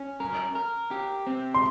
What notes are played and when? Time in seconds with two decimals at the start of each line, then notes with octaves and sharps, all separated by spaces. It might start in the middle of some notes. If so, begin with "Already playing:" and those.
Already playing: C#4
0.20 A#4
0.55 A#4
0.91 G4
1.27 C4
1.54 C6